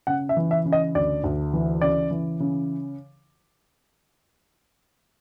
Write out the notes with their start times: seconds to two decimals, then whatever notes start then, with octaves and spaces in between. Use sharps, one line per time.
0.07 C#3 F#5
0.29 E5
0.37 E3
0.51 E5
0.66 C#3
0.73 D#5
0.95 D2 D5
1.24 D2
1.53 E3
1.81 C#3 D5
2.11 E3
2.40 C#3